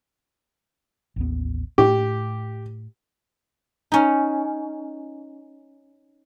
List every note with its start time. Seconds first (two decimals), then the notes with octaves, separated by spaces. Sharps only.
1.16 A1 D#2 B3
1.78 A2 A3 G4
3.92 C#4 D#4